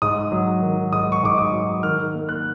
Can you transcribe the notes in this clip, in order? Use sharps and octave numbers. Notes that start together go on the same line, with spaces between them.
G#2 D#6
F#3
D#3
G#2 D#6
C#6
G#2 D6
D#6
F#3
D#3 F6
A#3
F#6